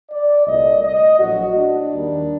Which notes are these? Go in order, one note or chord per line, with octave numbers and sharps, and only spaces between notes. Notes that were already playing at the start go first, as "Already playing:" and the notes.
D5
C2 A#2 A3 D#5
D#5
A#1 A2 F#3 A3 F#4
D4
D#2 D#3 G3